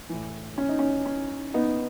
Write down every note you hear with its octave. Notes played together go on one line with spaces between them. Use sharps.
A2 E3
C#4
D#4
C#4
C#4
B3 D#4